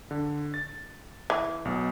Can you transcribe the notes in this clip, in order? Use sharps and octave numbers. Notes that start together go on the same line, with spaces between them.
D3
A6
E3
B1 B2